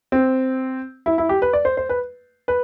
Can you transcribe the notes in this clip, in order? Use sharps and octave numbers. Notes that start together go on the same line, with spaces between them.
C4
E4
E4
G4
B4
D5
C5
C5
B4
B4